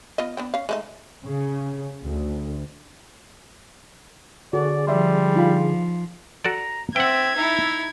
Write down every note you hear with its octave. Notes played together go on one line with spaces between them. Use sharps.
B3 F4 D#5
B3 D4 G5
C#4 F5
G#3 A3 D#4
C#3
D2
D3 F#4 G#4 A4 D5
F3 G3 D5 E5 C6
D#4 F4 B5
F#4 A4 D5 A#5
C4 E5 F#5 G5 G#6
D#4 E4 E5